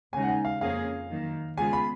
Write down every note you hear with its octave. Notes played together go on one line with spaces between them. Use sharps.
D#2 C#3 G#3 D#4 G#5
F#5
G#5
F5
F2 F3 A#3 C#4 G#4 F5
F#2 D#3 A#3
C#3 G#3 B3 F4 G#4 G#5
B5